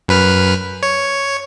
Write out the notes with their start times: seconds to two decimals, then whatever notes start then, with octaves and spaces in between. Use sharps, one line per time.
0.08 F#2 B4 F6
0.83 C#5